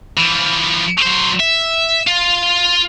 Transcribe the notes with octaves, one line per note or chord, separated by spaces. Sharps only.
E3 F3
F#3 C5
E5
F4